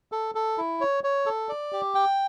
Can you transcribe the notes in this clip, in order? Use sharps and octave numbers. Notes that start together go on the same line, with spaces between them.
A4
A4
E4
C#5
C#5
A4
D5
G4
G5